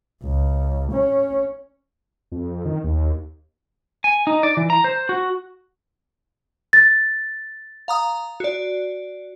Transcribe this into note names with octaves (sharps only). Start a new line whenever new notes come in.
C#2
C#4
F2
D#3
D#2
G#5
D#4
D5
E3
A#5
C5
F#4
A6
F5 A#5 D#6
F#4 D5